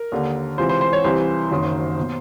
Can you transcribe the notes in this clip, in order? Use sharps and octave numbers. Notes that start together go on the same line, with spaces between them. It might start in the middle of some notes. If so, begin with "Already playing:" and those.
Already playing: A#4
D#2 D3
C#2 C3 E3 C5
C5
C5
C#5
C2 C3 E3 C5
F#1 F#2 D#3
B2